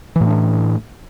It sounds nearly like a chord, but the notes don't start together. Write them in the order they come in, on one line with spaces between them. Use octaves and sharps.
E3 A2 D4 A3